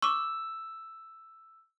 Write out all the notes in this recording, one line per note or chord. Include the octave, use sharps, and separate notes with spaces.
C#6 D6 E6